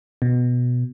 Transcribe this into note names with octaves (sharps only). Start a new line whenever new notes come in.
B2